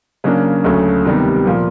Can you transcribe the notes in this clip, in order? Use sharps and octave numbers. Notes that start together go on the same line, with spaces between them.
C#3 F#3 A#3 D4
D2 C#3 F#3 A3
C3 D#3 G3 B3
A#2 F3 A#3